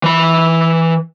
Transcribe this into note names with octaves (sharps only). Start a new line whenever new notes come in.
E3 B5